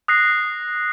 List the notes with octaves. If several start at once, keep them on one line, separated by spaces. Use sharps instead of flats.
D#6 F#6 A#6 C7